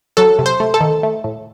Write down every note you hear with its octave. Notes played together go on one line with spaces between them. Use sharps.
F#3 A4
C3
C5
A3
A4
D#3
A3
A2